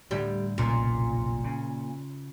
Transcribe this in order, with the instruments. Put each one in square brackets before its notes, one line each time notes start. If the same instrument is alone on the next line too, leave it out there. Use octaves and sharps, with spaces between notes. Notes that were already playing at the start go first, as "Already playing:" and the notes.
[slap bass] A2 D3 [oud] G3
[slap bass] F1 B1 C#3 [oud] A#2
[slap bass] C#3